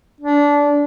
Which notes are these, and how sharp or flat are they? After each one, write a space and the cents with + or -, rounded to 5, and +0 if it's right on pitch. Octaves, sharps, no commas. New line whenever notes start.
D4 -20